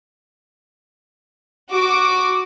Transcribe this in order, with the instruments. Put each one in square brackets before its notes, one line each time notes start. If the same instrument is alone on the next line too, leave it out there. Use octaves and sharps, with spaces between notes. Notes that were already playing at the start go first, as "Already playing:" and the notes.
[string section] F#4 D6